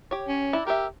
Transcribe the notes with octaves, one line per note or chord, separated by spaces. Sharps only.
G4 C#5
C#4
D4 E4
G4 A#4 E5